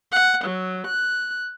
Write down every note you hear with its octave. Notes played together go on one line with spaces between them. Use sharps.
F#5
F#3
F#6